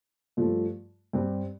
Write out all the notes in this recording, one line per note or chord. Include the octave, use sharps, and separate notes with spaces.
G2 F3 A3
G2 G3 C4 G4